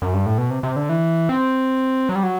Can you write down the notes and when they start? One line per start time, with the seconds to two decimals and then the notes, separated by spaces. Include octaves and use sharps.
0.02 F#2
0.13 G2
0.26 A2
0.38 B2
0.50 C3
0.63 C3
0.76 D3
0.89 E3
1.29 C4
2.09 F#3
2.15 G3
2.23 F#3